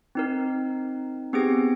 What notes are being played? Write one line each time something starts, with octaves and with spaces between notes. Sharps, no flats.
C4 D#4 A#4
B3 C4 G4 G#4 A#6 D7